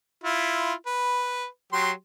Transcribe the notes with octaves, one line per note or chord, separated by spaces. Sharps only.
E4 F4
B4
F#3 G4 C6